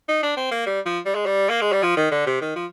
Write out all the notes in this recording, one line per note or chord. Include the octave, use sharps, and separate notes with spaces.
D#4
D4
C4
A#3
G3
F3
G3
G#3
G3
A#3
G#3
G3
F3
D#3
D3
C3
D#3
F3